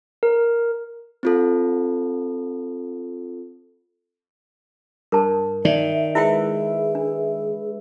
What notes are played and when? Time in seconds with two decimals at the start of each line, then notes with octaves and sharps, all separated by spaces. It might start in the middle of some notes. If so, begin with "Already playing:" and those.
0.23 A#4
1.23 C4 F4 A4
5.12 G2 A#4 A5
5.65 D#3 D5 E5
6.15 G#3 E4 G#4 B4 E5 G5
6.95 D4